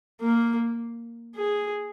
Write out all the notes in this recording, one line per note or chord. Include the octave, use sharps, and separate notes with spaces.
A#3
G#4